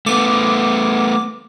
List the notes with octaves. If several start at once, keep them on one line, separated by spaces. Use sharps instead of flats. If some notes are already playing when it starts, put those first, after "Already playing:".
A3 B3 D6